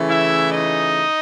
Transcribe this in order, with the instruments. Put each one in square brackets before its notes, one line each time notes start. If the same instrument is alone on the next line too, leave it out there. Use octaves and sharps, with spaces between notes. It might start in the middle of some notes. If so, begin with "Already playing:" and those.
Already playing: [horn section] C#3 E3 A3
E4 E5
D#4 D#5